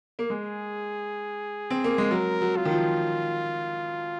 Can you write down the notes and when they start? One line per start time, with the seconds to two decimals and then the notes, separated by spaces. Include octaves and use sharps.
0.19 A#3
0.30 G#3 G#4
1.70 C4
1.84 A#3
1.98 G#3
2.11 F#3 A#4
2.41 F#3
2.56 F4
2.65 D#3
2.71 F3